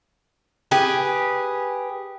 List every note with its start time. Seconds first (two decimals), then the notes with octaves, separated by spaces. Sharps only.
0.71 G4 G#4 B4